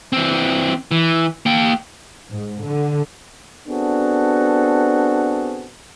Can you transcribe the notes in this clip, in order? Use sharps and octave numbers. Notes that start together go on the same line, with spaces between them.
E3 C4
E3
A#3 G5
G#2
D3
B3 C4 D4 F#4 G#4 A4